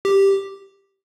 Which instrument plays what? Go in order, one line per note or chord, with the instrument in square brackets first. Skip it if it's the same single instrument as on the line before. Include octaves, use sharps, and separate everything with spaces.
[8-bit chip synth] G4